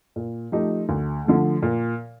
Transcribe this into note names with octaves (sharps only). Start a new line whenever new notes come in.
A#2
F3 A3 D#4 G4
D2
D3 F3 A3
A#2